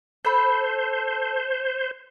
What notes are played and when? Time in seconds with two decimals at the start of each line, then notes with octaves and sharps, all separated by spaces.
0.25 A4 C5 B5